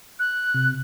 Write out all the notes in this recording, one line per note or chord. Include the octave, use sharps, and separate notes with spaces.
F#6
C3